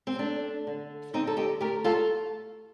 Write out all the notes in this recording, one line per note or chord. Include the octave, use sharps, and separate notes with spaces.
C4
A3 D4
D3
D3 C4 D#4
A4
D#4 G4
A3 G4 A#4
F4 A4